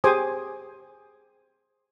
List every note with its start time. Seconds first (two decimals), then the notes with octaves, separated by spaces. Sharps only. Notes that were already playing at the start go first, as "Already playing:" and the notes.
0.04 G4 G#4 C5 G#5 D6 D#6